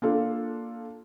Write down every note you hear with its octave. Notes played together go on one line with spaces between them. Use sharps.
A#3 D4 F4 A4